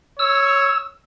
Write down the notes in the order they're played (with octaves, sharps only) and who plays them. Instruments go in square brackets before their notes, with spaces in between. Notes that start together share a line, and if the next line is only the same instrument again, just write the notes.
[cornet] C#5 [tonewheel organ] E6